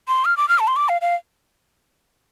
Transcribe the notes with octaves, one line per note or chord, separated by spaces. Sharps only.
C6
F6
D6
F6
A5
C6
D6
F5
F5